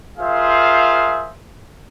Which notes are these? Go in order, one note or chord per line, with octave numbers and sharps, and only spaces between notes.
F4 G#4 A#4 C5 E5 F5